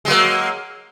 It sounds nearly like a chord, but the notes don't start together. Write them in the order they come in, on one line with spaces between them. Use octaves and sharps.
G#3 F#3 A#3